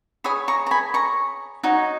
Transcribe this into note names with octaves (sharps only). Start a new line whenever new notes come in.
G#4 C#5 B5 D#6
A#5 C#6
A#5
G#5 B5
A#5 C#6
D#4 F#4 C#5